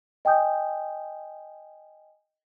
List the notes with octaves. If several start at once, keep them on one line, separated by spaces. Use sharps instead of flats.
D#5 G5 G#5 D#6 G6